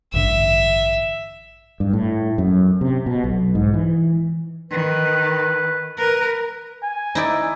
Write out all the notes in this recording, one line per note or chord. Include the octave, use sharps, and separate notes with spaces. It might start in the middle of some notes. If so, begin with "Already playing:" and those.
A1 G2 D3 E5
G2
A2
F#2
C3
B2
B1
G#2
E3
D#3 B4
A#4 B4
G#5
D#4 E4 D5